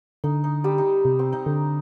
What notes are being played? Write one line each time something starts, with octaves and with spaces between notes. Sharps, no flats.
D3 D#4
D#4
G3 G4
D#4
C3
C4
D#4
D3